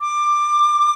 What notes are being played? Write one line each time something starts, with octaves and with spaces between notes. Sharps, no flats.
D6